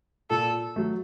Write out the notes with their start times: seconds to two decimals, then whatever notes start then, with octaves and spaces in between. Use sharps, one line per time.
0.30 A#2 A4
0.76 F#3 A3